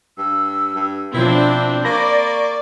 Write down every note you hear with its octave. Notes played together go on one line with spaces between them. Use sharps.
G2 E6
G2
B2 F3 C4 D4 E4 F4
A#3 D5 B5 C#6 A#6